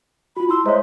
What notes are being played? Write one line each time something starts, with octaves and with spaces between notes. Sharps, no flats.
F4 F#4 B5
E4 C6 E6
G#3 C5 C#5 E5 A#5